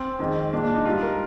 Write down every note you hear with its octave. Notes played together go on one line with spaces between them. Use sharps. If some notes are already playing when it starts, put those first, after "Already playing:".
Already playing: C4
F2 D#3 G#3
A#2 G#3 D4
D4
D#4
G#2 G3 F4
A#4